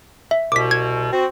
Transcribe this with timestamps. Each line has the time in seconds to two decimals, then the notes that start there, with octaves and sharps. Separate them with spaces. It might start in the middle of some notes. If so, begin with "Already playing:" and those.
0.31 E5
0.52 C2 B2 D6 B6
0.71 G#6
1.12 C4 F#4